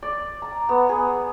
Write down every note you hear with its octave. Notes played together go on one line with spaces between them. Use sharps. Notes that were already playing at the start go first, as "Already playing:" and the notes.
D5
A#5
B3
G#4